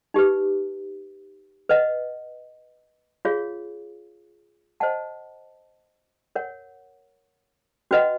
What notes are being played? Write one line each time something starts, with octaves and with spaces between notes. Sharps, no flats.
D#4 G4 B4
B4 D#5 F#5
F4 G#4 C#5 F5
C5 D#5 F#5 A5
A#4 C#5 F#5
C#4 F#4 B4 D#5 F#5